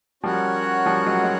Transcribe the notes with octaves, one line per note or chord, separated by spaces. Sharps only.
F3 G3 C#4 F#4 A#4 C#5 F#5
F3 G3
F#3 G#3
G#3